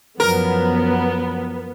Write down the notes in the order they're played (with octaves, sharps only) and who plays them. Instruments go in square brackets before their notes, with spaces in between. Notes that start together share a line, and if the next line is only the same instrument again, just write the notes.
[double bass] F#2 F3 [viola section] B3 [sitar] A#4